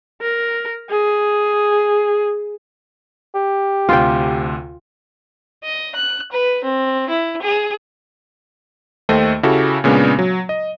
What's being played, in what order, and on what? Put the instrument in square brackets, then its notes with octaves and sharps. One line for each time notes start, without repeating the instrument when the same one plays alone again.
[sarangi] A#4
G#4
[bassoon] G4
[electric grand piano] D2 C3 C6 [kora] F4 G5
[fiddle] D#5
F#6
B4
C4
E4
G#4
[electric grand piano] D#2 A3 C5 D#5 G5
C#3 E4 F#4 G4 A4
A#2 C#3 G#3 B3 C#4 D4
F#3
D#5